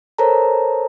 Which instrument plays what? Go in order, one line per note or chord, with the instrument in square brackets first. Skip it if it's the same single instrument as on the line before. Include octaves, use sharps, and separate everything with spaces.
[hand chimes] A4 A#4 C5 C#5 A5 A#5